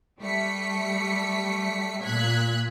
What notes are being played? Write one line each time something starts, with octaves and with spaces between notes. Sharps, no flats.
G3 A3 B6 C#7
A#2 F#6 G#6 B6